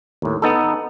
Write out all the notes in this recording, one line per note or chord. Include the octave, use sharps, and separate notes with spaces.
D#2 A2
B3 D#4 A4